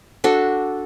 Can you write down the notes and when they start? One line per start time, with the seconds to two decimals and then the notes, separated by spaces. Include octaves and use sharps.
0.24 D4 F#4 A4